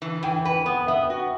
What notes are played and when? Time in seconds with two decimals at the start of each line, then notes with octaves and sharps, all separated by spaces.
0.02 E3
0.23 E3 G5
0.44 B4 G5
0.66 B3 F#5
0.87 B3 E5
1.10 F#4